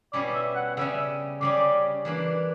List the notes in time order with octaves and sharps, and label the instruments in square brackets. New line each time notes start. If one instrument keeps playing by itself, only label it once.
[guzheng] B2 G3 C#4 E4 [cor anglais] D5
[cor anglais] E5
F#5
[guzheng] C#3 G3 C#4 [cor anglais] E5
[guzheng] C#3 G3 C#4 [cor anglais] D5
[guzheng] E3 A#3 D4